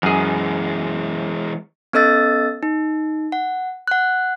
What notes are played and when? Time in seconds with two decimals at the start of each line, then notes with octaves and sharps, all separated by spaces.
0.03 F#2 E3 G#3 G#4
1.93 B3 C#4 A4 D#5 E6 A6
2.63 D#4
3.32 F#5
3.87 F#5 F#6